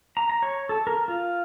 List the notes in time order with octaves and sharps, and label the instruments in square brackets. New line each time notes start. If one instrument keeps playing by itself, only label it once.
[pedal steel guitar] A#5
A#5
C#5
A4
A#4
F4